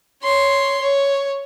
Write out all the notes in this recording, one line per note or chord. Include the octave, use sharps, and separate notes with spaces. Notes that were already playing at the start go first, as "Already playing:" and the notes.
C#5 C6
C#5